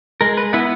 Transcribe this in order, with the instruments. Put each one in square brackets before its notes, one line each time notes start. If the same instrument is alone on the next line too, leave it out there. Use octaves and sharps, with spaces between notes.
[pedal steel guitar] G#3 A#4
B4
B3 E4 B4